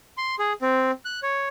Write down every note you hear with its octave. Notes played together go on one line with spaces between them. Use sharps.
C6
G#4
C4
F#6
C#5